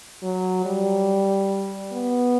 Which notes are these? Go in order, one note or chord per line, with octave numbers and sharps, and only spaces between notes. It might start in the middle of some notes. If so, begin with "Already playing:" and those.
F#3
G3
B3